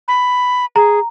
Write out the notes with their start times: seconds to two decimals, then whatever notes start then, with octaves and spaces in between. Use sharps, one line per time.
0.08 B5
0.76 G#4 A#5